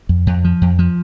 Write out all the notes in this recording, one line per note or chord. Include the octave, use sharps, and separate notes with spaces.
F2
F2
F3
F2
F3